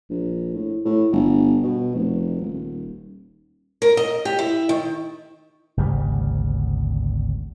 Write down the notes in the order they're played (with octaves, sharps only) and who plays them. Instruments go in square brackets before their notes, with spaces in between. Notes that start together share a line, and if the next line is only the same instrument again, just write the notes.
[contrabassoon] A#1
A2
A2
G1
B2
F1
D#1
[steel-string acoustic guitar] A#4
D#5
G4
E4
D#3
[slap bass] G#1 D2 C#3 G3